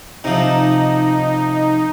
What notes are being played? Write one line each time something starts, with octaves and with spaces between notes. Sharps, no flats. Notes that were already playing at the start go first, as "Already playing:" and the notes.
C3 F3 D#4